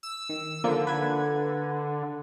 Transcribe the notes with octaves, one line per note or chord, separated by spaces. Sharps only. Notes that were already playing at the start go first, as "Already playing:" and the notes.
E6
D#3
D3 F3 A#3 F4
B4 G#6